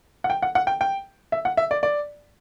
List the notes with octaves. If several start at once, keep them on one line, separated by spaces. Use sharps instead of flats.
F#5
G5
F#5
F#5
G5
G5
E5
F#5
E5
D5
D5